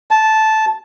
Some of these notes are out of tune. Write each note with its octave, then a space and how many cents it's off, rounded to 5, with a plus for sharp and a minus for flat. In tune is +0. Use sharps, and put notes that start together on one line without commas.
A5 -10